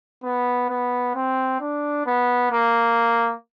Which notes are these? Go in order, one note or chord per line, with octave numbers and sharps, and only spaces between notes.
B3
B3
C4
D4
B3
A#3